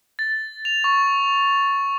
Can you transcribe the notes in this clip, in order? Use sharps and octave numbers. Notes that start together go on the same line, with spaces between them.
A6
F7
C#6